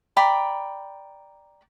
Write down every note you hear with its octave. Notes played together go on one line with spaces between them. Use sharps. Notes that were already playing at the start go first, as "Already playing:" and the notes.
D5 G5 A#5 B5